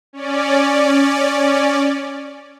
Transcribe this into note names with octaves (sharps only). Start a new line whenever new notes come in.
C#4 D5